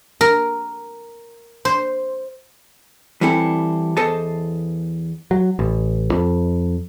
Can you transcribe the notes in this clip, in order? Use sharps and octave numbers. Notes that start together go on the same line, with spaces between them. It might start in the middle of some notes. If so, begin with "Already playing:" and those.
A#4
C5
E3 G3 C4 E4 A4
E2 A4 C5 D#5 A5
F#3
A1
F2